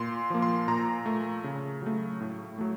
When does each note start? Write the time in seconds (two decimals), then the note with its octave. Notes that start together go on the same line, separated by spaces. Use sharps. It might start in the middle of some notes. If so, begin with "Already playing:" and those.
Already playing: A#2 C6
0.30 F3 A#3
0.42 C6
0.68 A#2 A#5
1.06 A3
1.44 C#3
1.82 F#3 A3
2.20 A2
2.58 F#3 A3